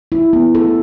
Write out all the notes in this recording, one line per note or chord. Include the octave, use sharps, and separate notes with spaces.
E4
B3
A4